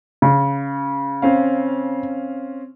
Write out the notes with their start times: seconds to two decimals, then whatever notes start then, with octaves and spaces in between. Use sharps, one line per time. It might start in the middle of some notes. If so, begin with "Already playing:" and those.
0.22 C#3
1.22 C4 C#4 F5